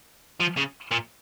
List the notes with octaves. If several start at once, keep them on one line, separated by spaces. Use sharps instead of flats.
F3
C#3
A#2